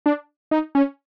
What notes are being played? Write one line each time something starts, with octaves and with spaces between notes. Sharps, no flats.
D4
D#4
C#4